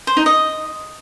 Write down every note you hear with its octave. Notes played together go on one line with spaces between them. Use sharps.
C5
D#4
D#5